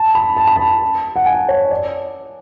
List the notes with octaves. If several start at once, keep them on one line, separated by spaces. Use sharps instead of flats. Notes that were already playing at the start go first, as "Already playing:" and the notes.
Already playing: A5
B5
A5
B5
A5
F#5
G#5
C#5
D5